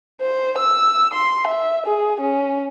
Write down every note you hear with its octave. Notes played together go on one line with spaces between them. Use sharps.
C5
E6
C6
E5
G#4
C#4